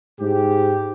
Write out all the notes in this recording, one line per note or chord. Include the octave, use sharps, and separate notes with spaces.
G#2 G4